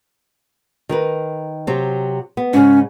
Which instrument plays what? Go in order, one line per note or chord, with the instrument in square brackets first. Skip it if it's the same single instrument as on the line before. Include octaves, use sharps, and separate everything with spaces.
[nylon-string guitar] D#3 A#4 B4
C3 F#3 C4
B3
[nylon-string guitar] G#2 C#3 [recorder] C#4